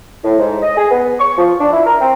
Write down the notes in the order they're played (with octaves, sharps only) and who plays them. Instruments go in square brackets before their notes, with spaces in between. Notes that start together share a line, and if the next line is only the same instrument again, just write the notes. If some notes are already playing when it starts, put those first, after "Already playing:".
[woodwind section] A2
G#2
D#5
G#4
B3
C#6
F3
D4
E4
A#4
C4